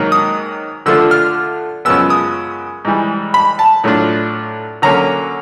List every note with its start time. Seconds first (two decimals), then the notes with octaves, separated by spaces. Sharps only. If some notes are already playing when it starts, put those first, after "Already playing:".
Already playing: G#2 D#3 F#3 A#3
0.12 D#6
0.86 D3 F3 A3 D4 F4 E6
1.11 F6
1.85 F#2 C#3 F3 G#3 B3 E6
2.10 D#6
2.85 G#2 E3 G3
3.34 B5
3.59 A5
3.84 A2 F#3 A3 D4 F4
4.82 D3 F#3 A#3 C#4 A#5